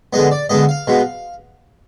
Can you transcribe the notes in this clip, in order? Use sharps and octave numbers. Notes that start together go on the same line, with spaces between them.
D3 G#3 B3 D#5
D5
D3 G#3 B3 D#5
F5
B2 G#3 B3